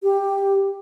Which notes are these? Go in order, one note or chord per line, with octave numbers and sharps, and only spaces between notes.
G4